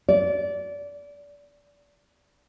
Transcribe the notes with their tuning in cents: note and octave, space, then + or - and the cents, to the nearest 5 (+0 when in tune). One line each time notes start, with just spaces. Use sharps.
D5 -25